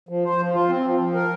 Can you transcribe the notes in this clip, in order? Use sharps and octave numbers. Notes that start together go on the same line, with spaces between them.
F3
C5
F3
F4
C4
F3
F3
A#4